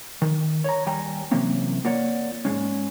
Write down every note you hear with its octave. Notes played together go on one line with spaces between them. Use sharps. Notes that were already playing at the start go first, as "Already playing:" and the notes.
D#3
C#5 A#5
D#2 G3 G5 G#5 A#5
C3 E3 F#3 A#3 C4 C#4
A#3 F4 C#5 D5 F#5
G#2 B2 G#3 C#4